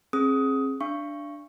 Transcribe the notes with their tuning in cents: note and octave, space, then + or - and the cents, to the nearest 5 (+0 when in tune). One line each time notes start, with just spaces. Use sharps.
C4 +35 G#4 +15 D#6 +15
D4 +0 F5 -35 C#6 +0